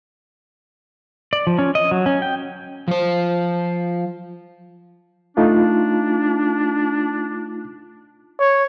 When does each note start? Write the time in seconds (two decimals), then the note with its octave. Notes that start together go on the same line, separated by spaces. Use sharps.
1.33 D5
1.47 F3
1.59 C#4
1.75 D#5
1.91 F#3
2.06 C#4
2.22 G5
2.88 F3 C5
5.37 A3 D4 D#4 F4
8.39 C#5